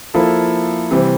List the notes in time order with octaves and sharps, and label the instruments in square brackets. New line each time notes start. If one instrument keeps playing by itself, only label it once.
[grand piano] F3 A#3 E4 A4
C3 E3 G3 C4